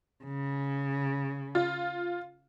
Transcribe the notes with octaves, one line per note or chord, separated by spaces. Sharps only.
C#3
F4